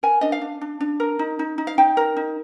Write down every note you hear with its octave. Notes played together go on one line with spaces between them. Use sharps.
A#4 G#5
D4 D#5
F5
D4
D4
D4
A#4
D#4
D#4
D#4
F5
D#4 G5
A#4
D#4